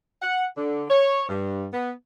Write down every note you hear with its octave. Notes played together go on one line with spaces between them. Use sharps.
F#5
D3
C#5
G2
B3